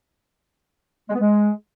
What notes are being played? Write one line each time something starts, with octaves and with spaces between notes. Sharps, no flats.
G#3
B3
G#3